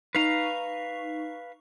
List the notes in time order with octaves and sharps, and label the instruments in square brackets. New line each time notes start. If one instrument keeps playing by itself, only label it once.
[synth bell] D#4 C#6 [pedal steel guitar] B4 F5 A#5